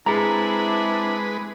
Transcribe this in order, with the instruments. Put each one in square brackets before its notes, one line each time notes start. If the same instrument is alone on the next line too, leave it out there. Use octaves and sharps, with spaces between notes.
[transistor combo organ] G#3 B4 [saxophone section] C4 D4 E4 [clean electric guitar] G#4 A#5